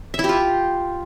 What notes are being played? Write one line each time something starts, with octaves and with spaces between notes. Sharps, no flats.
E5
E4
G4
F4